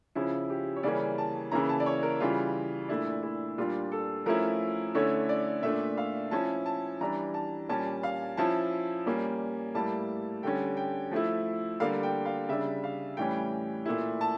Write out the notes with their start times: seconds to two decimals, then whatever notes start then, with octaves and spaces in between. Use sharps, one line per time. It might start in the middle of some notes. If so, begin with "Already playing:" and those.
0.15 C#3 F3 C#4 E4
0.50 G4
0.76 C#5
0.83 C#3 E3 G3 A#3 C#4 D5
1.18 A5
1.52 C#3 E3 A#3 C#4 E4 A#5
1.69 A5
1.80 D5
1.86 C#5
2.03 A#4
2.20 C#3 E3 G3 F4
2.88 A#2 A3 D4 E4
3.23 E4
3.58 A#2 G3 D4 F4
3.92 A4
4.26 F3 A3 C#4 E4 A#4
4.95 D3 A3 C#4 E4 C#5
5.29 D5
5.63 A#2 A3 D4 E5
5.97 F5
6.31 F3 C#4 E4 A5
6.66 A5
7.01 E3 G3 D4 A#5
7.34 A5
7.69 A#2 G3 C#4 A5
8.03 F5
8.37 F3 C#4 E4 A5
9.06 A#2 G3 A#3 C#4
9.74 A2 G3 A#3 E4 A5
10.43 D3 G3 C#4 G5
10.77 G5
11.11 F3 A3 E4
11.80 D3 G3 A#3 F5
12.03 G5
12.25 F5
12.48 C#3 G3 D4 E5
12.84 F5
13.17 A2 E3 G3 C#4 G5
13.85 A#2 A3 E4
14.21 A5